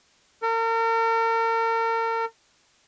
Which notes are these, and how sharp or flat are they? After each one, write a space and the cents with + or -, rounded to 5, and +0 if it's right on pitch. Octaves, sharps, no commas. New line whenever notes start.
A#4 -40